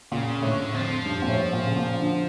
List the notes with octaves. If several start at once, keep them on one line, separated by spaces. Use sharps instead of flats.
A#2 C#3
A2 D3
F2 F3
G2
A#2
A2
A#2
C#3
A#2
D3